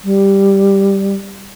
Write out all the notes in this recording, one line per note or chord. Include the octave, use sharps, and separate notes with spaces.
G3